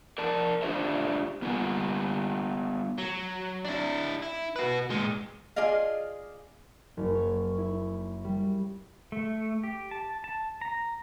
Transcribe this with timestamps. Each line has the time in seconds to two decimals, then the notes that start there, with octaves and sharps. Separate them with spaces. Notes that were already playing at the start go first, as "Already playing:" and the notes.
0.18 A#4 D5 A5
0.62 D4 F4 G4 C5 E5
1.42 G3 B3 F4 F#5 G#5
2.98 F#3
3.65 D4 E4
4.22 E4
4.56 F#4 B4
4.90 A#2 G#3
5.56 F4 G#4 D5 D#5 F5
6.97 F#1
7.15 C#5
7.58 E4
8.24 G3
9.12 A3
9.64 G4
9.91 A5
10.24 A5
10.61 A#5